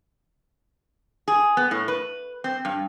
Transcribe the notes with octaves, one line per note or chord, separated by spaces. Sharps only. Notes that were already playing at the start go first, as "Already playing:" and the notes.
G#4
B3
A2
B4
C4
G2